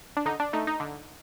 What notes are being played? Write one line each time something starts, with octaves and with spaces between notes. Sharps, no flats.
D4
D3 D#4
D4
A3 D#4
D#4
D3